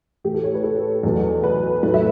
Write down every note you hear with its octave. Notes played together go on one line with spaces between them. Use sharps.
A2 E3 A3 G4
A4
C#5
B4
A4
E2 B2 F#3 A3
B4
A2 F#3 A3 B4
E5